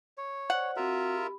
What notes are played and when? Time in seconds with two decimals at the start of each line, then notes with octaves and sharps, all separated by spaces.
0.18 C#5
0.50 C5 D5 F#5
0.76 C4 F4 F#4 A#4 E5
1.14 G4 B5